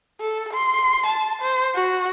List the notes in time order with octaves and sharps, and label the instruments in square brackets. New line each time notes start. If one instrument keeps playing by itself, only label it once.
[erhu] A4
C6
A5
C5
F#4